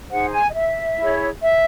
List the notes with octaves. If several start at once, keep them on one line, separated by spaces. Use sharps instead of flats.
D#4 G#4 C5 F#5
G#5
D#5
E5
E4 G#4 C#5
E5